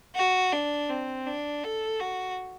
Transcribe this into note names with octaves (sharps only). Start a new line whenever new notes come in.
F#4
D4
C4
D4
A4
F#4